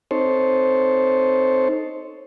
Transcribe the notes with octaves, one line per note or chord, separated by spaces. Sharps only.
C4 D#4 A4 C5 C#5